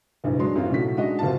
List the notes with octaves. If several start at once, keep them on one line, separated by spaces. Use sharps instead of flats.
F#1 B1 G2 E3
F#3 G#3 D4 C6
F#2 E3 C4 F4 F#4
B1 A2 C#3 A3 F#4 B6
G#3 D4 D#4 F#4 D#5
F#1 D2 C3 F4 F#4 A5